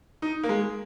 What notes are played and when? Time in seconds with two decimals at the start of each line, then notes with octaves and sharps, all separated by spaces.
0.22 D#4
0.43 A#3
0.49 G#3